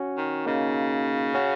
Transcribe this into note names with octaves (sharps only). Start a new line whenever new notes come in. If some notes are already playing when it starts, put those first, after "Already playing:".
Already playing: C#4 F#4
D#3
C#3 A#3 D#4
C#4 F#4